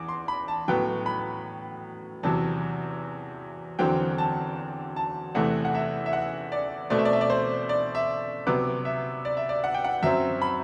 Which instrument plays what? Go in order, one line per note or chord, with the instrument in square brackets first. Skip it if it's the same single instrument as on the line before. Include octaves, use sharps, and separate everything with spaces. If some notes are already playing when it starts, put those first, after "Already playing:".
Already playing: [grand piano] E2 D6
C6
B5
A5
A2 F#3 B3 G5
B5
E2 C3 F#3 A5
E2 D3 F#3 C4 G5
A5
A5
E2 C3 E3 A3 F#5
F#5
E5
E5
F#5
D5
B2 A3 C4 D5
E5
D5
E5
D5
C5
D5
E5
C3 F#3 B3 D6
E5
D5
E5
D5
F#5
G5
F#5
F#2 F#3 C4 E5
B5